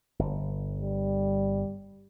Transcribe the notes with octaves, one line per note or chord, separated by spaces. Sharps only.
G1
G3